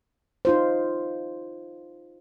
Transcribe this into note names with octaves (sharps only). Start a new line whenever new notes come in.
D#4 F4 C5